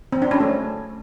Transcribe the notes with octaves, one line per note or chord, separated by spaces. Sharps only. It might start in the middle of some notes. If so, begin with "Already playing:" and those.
C4
D4
C#4
A3